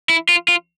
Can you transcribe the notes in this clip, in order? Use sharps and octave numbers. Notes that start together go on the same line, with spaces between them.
E4
F4
F4